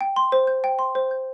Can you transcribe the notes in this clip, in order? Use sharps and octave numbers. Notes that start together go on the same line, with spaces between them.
G5
C6
C5
G6
G5
C6
C5
G6